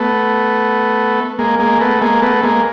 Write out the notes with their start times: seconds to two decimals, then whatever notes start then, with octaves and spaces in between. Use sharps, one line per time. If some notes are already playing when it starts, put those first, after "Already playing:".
Already playing: A3 B3
1.39 G#3 A#3
1.59 G#3 A#3
1.80 A3 B3
2.01 G#3 A#3
2.22 A3 B3
2.43 G#3 A#3